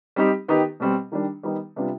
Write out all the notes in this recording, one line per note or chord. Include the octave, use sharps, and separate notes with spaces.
G3 C4 D#4 G4
D#3 B3 D#4 G4
B2 G3 C4
D#3 G3 D4
D#3 G3 B3 D#4
C3 G3 B3 D4 F4